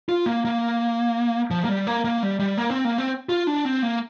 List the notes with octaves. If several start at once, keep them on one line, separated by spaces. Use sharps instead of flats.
F4
A#3
A#3
F3
A#3
G3
A#3
A#3
G3
G3
A#3
C4
A#3
C4
F4
D4
C4
A#3